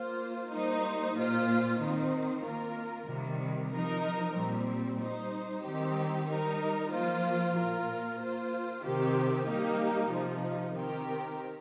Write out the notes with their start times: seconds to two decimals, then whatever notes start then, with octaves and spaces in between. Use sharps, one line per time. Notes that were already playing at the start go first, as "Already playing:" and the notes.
Already playing: A#3 F4 C5
0.51 G3 A#3 D#4 C5
1.16 A#2 A#3 F4 C5
1.80 D#3 C4 D#4 C5
2.44 A#3 F4 A#4
3.07 C3 D#3 G3
3.71 F3 D#4 A#4
4.35 A#2 G3 C4
4.99 G3 D#4 C5
5.64 D#3 G3 C4 D#4 G4
6.27 G3 D#4 A#4
6.91 F3 A#3 F4 C5
7.56 A#2 A#3 F4 A#4
8.20 A#3 F4 C5
8.83 C3 D#3 C4 G4
9.48 G3 A#3 D#4 G4
10.11 C3 F3 D#4
10.75 D#3 C4 G4 A#4